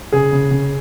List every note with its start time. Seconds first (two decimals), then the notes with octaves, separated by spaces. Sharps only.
0.12 C#3 G#4
0.32 C#3
0.51 C#3